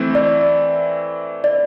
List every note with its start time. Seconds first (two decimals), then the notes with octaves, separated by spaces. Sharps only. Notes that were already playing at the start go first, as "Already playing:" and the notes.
Already playing: E3 A3 C4 E4
0.15 D5
1.44 D5